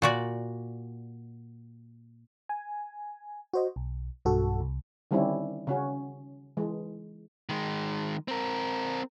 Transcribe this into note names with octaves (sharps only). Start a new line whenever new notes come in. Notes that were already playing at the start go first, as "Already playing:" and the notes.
A#2 F#4 D5
G#5
F#4 C5 D#5
B1
B1 G2 F#4 A4
C2
D3 D#3 G3 C4 C#4 E4
C#3 C#4 F#4
E3 G#3
D#3 G#3
C4 A#4